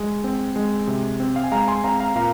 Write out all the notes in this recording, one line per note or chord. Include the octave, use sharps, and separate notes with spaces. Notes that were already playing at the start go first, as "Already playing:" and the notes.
Already playing: G#3
C4
G#3
C3
C4
F5
G#5
G#3 F5 A#5
G#5 C6
C4 F5 A#5
F5 A#5
A#2 F5 A#5